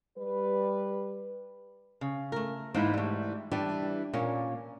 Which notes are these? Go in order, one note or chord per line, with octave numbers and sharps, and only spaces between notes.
G3 B4
C#3
A3 A#4
G#2 E3 A#3 D#4 E4
G3 A3
E3 G3 D4 G4
A#2 A#3 C#4